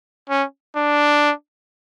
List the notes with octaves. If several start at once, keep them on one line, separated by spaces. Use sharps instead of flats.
C#4
D4